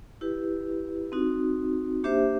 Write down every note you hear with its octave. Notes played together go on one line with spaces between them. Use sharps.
E4 G4 B4
C4 D#4 F#4
A#3 D4 G4 C5 E5